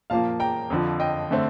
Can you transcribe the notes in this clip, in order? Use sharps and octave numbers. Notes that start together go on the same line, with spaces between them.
A#2 F3 A#3 F5 A5
G5 A#5
F2 D3 F3
D#5 G5
D3 A3 C4